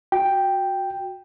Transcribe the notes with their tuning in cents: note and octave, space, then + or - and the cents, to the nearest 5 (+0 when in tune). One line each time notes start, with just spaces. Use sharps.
F#4 -15 G5 +0